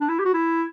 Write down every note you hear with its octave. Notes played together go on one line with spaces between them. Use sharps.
D4
E4
G4
F#4
E4